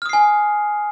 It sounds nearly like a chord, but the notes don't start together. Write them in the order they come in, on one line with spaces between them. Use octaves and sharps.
F6 D#6 C7 G#5